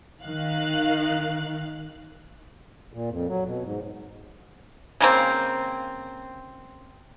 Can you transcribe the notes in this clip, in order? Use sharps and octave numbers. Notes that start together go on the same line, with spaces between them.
D#3 F5 F#6
A#2
F2
F#3
B2
G#2
C#3 A#3 C4